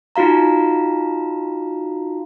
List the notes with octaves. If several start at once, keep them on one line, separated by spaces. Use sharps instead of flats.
D#4 F4 F#4 F5 A#5